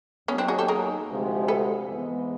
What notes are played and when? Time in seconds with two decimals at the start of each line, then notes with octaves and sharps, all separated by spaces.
0.28 D#2 D#3 F#3 A#3 B3 C#4 D#4
0.38 C4 D4
0.48 F#4 G#4
0.59 G4 A4
0.68 G#4 A#4
1.08 D2 C3 F3 G#3
1.48 A4 B4
1.88 G#2 E3 G#3 B3